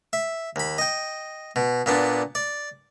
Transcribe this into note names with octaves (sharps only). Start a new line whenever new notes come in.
E5
D#2 B5
D#5 G5
B2
A#2 B3 D4
D5